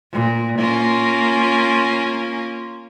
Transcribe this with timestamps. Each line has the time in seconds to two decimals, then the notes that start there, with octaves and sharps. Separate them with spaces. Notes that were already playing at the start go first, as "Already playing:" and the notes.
0.13 A#2
0.59 A#3 C#4 F4